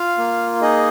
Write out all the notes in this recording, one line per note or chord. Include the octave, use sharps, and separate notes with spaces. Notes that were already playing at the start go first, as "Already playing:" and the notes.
Already playing: F4 F5
A#3
D#4 G#4 D#5